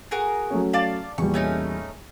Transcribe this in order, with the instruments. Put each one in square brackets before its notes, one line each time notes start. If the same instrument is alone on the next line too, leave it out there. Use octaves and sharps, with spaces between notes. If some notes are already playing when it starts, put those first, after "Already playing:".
[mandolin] F#4 G#4 A#4
[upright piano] F#3 A3 C#4
[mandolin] D5 F5 A5
[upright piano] E2 A#2 G3 [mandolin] C#6
[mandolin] A3 C#4 D#4